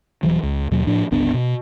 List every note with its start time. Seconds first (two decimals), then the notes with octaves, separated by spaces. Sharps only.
0.23 D#1 E3 F#3
0.43 C#2
0.71 D#2 B2 F#3
0.87 A2 F3 D4
1.11 G1 C#2 B3 D4
1.34 B2